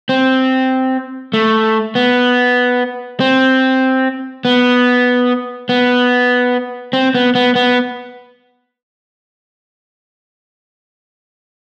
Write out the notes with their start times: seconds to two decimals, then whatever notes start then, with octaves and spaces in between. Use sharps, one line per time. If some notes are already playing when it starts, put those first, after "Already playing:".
0.09 C4
1.33 A3
1.95 B3
3.20 C4
4.45 B3
5.69 B3
6.93 C4
7.15 B3
7.35 B3
7.55 B3